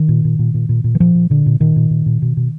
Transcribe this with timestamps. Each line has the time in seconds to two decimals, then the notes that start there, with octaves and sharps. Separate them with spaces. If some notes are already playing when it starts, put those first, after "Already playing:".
Already playing: D#3
0.09 A#2
0.25 A#2
0.39 A#2
0.54 A#2
0.69 A#2
0.84 A#2
0.95 E3
1.00 A#2 F3
1.15 A#2
1.30 A#2 D3
1.46 A#2
1.60 A#2 D#3
1.76 A#2
1.90 A#2
2.06 A#2
2.22 B2
2.37 B2